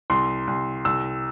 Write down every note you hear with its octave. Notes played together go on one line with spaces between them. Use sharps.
C2 C6
C2
C2 E6